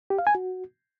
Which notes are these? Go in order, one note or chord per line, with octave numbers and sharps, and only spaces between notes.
G4
F5
G#5
F#4